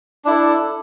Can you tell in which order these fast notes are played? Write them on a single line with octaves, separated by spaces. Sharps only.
D4 E4 A4